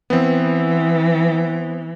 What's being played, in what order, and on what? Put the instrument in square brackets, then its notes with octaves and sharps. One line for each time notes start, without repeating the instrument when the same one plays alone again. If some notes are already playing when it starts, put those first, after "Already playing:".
[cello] E3 [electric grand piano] B3 C4